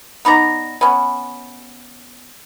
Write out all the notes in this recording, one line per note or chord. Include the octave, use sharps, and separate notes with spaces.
B3 D#4 D5 A#5
B3 C#4